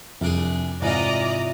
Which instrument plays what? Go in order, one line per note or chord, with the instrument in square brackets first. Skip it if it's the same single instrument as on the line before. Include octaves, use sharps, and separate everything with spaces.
[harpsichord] C2 D4 G#4 [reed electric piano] F2
[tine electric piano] G#2 [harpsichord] C3 E3 F4 [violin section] D5 D#5 A#5